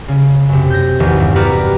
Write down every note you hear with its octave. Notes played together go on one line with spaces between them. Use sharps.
C#3
F#2 C3
G6 A#6
A1 E2 D#3
G2
F#4 G4 B4 D5 A#5 F6